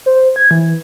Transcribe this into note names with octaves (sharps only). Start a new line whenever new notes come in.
C5
G#6
E3